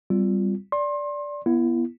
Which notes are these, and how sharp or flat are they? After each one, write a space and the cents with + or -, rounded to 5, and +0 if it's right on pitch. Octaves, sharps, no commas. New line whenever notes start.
G3 -5 C4 -40 F4 +0
D5 -10 C6 +30
B3 -20 E4 +30